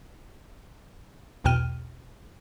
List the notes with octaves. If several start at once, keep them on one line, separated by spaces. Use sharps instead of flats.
B1 E2 B2 G5 F6 D#7